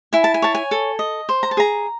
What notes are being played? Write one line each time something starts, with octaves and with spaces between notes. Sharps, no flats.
E4 G#5
A5
G#5
C#5 A5
G#5
A4
D#5
C5
A#5
A5
G#4 A#5